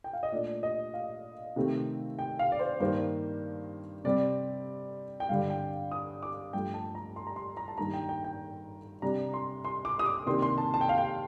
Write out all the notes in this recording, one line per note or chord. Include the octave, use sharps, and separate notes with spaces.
G5
F5
D#5
A#2 A3 D4 D5
D#5
F5
C3 D#3 A3 C4
G5
F5
D5
C5
G2 D#3 A#3 D4 C5
C3 G3 C4 D5
G5
G2 D3 G3 F5
G5
D#6
D6
G2 F3 A3 G5
A5
A#5
C6
A#5
C6
A#5
A5
G2 D#3 A#3 A#5
G5
G5
G5
C3 G3 D4 A#5
C6
C6
D6
D#6
D6
C3 D#3 A#3 D4 C6
C6
A5
A5
G5
F5
G5